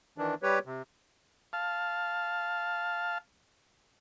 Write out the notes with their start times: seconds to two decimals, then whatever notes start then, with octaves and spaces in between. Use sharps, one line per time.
0.18 D#3 E3 D4
0.43 G3 G4 B4 C#5
0.66 C3
1.53 F5 A5